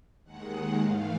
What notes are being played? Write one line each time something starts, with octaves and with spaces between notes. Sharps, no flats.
D#2 D#3 G#3 F#5
G#2 E3 A3 F5